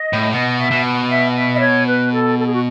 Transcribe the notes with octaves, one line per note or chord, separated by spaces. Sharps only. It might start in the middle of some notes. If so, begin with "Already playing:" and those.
Already playing: D#5
A2
B2 D#5
E5
B2
F#5
E5
F#5
E5
D#5
C#5
B4
A4
A4
G#4
F#4